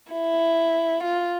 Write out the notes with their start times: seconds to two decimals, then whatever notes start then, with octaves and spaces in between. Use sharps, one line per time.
0.13 E4
1.04 F4